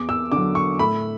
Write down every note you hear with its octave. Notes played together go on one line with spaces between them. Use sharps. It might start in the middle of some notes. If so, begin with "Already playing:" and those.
Already playing: E2 D6
E6
D3 F#3 D6
C#6
A2 B5